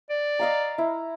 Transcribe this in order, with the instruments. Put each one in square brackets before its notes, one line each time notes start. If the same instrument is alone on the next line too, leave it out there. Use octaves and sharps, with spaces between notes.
[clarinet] D5
[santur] D#5 F5 A#5
E4